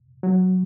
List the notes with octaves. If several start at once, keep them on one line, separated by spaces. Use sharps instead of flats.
F#3